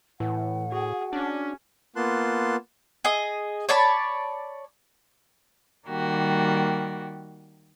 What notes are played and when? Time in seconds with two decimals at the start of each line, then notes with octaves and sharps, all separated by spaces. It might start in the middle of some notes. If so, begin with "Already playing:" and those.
0.20 A2 E3 F#5
0.72 F#4 G#4
1.13 C#4 D4
1.96 A#3 B3 F4 A5 C6 F#6
3.05 G#4 D#5
3.69 C#5 D5 A5 B5
5.87 D#3 G3 A#3 F#4 G4